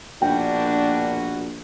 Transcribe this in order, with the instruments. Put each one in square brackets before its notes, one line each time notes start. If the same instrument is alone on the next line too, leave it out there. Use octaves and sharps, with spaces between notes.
[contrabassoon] A#1 [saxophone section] B2 A#3 F#4 [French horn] D4 [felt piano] G5